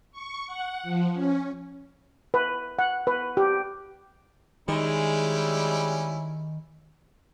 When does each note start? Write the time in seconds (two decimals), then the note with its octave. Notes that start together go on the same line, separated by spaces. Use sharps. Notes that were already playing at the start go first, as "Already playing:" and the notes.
0.12 C#6
0.47 F#5
0.83 F3
1.14 C#4
2.34 B4
2.79 F#5
3.07 B4
3.37 G4
4.68 D#3 G3 G#3 C#4 E4